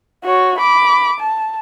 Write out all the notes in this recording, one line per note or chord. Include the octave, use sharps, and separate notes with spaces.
F#4 C#5
B5 D6
A5